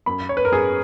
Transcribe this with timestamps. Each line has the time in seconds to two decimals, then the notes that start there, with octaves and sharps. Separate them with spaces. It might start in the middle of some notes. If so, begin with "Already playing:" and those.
0.06 F#2 B5
0.29 C#5
0.37 B4
0.45 A#4
0.52 F#2 G#4